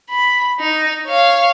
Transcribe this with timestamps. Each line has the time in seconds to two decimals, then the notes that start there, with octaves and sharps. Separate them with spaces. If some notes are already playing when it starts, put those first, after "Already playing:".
0.10 B5
0.60 D#4
1.07 C#5 F5